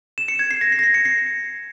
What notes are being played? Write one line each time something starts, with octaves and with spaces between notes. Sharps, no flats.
E7
C#7
G#6
C7
A#6
C7
A#6
C7
C#7
C7